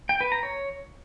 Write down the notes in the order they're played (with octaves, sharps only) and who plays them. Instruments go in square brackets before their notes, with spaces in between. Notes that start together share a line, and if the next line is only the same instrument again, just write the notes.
[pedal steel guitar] G5
B4
A#5
C#5